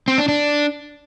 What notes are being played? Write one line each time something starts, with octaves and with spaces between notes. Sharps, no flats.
C4
D4
D4